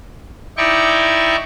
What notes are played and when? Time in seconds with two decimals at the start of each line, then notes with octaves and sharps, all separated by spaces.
0.57 D#4 E4 D5 G5 C#6